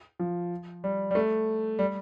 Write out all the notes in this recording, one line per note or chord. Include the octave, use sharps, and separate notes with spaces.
F3
G3
G3
A3
G3